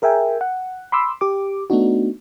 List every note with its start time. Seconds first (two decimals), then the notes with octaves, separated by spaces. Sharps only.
0.02 G#4 A#4 E5 G5 G#5
0.41 F#5
0.92 B5 C6 D6 E6
1.21 G4 D6
1.70 A3 B3 D4 D#4 F#4